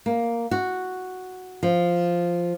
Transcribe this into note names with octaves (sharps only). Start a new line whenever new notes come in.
A#3
F#4
F3